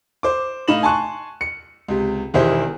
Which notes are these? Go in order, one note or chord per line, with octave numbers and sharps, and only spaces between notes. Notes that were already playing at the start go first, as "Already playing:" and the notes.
C5 D6
A2 D#4 F5 B5 E7 F#7
G#5 A5 C6 C#6 F#6
C#7
C#2 C3
E1 E2 D#3 E4 G4 C5